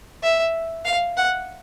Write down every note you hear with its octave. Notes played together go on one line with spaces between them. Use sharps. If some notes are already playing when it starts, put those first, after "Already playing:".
E5
F5
F#5